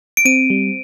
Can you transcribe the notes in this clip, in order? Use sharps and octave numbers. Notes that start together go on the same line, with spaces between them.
D7
C4 D#7
G3